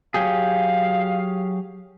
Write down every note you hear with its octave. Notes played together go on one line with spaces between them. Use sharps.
F#3 G4 G#4 F5